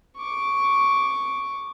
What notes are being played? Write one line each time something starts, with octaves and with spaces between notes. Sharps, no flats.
C#6 D6